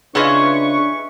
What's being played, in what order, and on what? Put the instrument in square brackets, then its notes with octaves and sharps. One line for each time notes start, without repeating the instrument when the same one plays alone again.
[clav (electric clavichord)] C#3 F4 [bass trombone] D4 [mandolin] E4 G#4 D#5 [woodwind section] B4 C#6